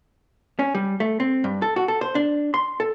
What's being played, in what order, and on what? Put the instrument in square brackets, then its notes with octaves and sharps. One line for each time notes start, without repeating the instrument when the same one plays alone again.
[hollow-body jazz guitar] C#4
G3
A3
C4
G2
A4
F#4
A4
C5
D4
C6
A4